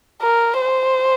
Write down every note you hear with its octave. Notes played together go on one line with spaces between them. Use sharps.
A#4
C5